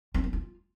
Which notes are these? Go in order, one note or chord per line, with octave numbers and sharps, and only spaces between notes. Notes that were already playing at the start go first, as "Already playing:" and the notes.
C4
B3
F4